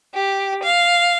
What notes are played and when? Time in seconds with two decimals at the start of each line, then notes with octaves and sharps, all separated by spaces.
0.15 G4
0.63 F5